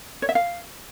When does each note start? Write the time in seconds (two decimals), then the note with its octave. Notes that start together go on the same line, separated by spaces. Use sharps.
0.22 C#5
0.29 E5
0.35 F5